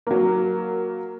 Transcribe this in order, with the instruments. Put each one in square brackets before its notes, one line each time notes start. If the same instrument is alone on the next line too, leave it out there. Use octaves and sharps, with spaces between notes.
[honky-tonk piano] F#3 A#3